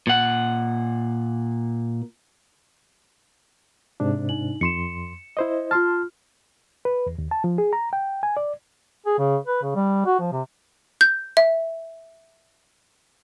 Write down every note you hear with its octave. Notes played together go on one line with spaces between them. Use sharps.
A#2 F#5
G#2 C3 D4
D#4 F#7
F2 C6 C#7 E7
E4 C5 D#5
F4 A5 C6 F6
B4
E2
D#2
A5
F3
G#4
A#5
G5
G#5
D5
G#4
C#3
B4
C#3
G3
F#4
F3
C3
G6
E5